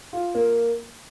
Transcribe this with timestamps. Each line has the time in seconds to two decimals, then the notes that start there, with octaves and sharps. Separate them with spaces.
0.13 F4
0.35 A#3